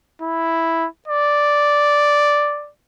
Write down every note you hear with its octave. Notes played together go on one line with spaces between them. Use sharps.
E4
D5